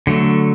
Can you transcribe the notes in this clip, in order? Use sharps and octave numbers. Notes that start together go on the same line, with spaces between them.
D3 F#3 A3